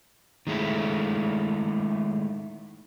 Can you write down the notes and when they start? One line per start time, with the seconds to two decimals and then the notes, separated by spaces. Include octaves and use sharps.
0.47 D#3 G#3 A3 E4